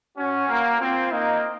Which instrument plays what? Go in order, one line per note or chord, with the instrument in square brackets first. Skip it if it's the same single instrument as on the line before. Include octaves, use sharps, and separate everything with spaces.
[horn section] C#4 [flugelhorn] F#4
[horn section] A#3
[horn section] C4 [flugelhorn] F4
[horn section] A#3 [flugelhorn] D#4